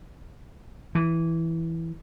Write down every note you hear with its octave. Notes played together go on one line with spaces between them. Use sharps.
E3